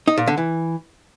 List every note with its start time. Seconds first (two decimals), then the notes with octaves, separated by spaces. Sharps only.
0.08 D#4
0.18 A#2
0.28 D3
0.38 E3